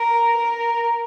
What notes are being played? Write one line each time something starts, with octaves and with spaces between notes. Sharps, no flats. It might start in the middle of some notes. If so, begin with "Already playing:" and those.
Already playing: A#4
A#4